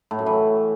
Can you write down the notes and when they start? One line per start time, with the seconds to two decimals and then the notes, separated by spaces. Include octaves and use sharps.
0.11 A2
0.19 F#2
0.26 E3